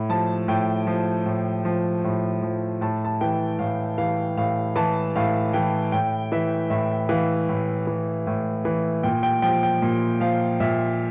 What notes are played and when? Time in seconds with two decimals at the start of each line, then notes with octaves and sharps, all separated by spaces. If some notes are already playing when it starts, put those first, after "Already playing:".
Already playing: A2
0.09 F3 A5
0.48 A2 G5
0.87 F3
1.26 A2
1.65 F3
2.04 A2
2.42 F3
2.81 A2 A5
3.05 A5
3.21 E3 G5
3.59 A2 F5
3.98 E3 F5
4.37 A2 F5
4.76 E3 A5
5.16 A2 F5
5.53 E3 G5
5.92 A2 G5
6.32 E3 E5
6.70 A2 E5
7.09 E3 F5
7.49 A2
7.87 E3
8.27 A2
8.65 E3
9.03 A#2 G5
9.23 G5
9.42 F3 G5
9.63 G5
9.82 A#2
10.20 F3 F5
10.60 A#2 E5